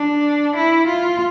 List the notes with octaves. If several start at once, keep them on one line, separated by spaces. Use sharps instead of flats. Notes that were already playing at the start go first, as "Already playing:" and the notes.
Already playing: D4
E4
F4